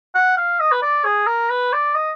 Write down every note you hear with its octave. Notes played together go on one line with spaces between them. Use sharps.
F#5
F5
D#5
B4
D5
G#4
A#4
B4
D5
D#5